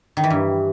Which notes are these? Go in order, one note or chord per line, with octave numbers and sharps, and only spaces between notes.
D#3
E3
G2